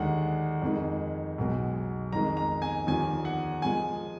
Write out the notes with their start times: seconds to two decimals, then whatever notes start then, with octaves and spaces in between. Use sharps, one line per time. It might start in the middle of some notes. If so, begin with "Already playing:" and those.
Already playing: D#2 D3 G#3 F#5
0.62 F2 D#3 G#3
1.38 B1 B2 G#3
2.13 F2 D#3 G#3 A#5
2.37 A#5
2.62 G#5
2.87 D#2 D3 F3 G#5
3.25 F#5
3.62 F3 G#3 G#5